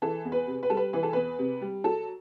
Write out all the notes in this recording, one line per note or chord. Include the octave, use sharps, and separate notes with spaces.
E3 A4
E2
B4
C3
B4
G3 A4
B4
E3 B4
A4
E2 B4
C3
G3
F#3 A4